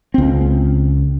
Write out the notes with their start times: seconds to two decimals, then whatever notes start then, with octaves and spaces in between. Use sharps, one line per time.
0.14 C#2 C4